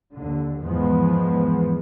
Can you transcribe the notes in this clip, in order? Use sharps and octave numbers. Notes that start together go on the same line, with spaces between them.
D#2 D3
E2 G#2 F3 G#3 B3